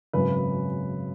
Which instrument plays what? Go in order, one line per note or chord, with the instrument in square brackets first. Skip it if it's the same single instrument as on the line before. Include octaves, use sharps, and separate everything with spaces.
[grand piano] G#1 F#2 C#3 F#3 B4